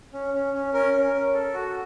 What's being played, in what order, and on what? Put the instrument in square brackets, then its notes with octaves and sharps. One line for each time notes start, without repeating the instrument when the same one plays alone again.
[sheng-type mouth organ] C#4
C#4
C#4
C#4 A#4
C#4
C#4
A4
F#4